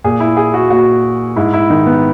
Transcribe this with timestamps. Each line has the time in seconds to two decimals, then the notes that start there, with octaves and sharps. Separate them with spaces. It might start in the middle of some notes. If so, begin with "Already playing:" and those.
0.04 A#2 G#4
0.20 E4
0.37 G#4
0.54 F#4
0.70 A#2 F#4
1.36 G#2 E4
1.53 E4
1.70 D#3 D#4
1.86 B3